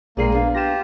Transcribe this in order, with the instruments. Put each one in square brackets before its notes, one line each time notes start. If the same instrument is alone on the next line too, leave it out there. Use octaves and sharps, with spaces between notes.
[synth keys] A#1 G#4 C7 [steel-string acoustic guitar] A#2 G#3 G5 [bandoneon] A#3
[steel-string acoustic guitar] B3 D4 F5
[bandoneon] F4 G4 [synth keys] A#6 E7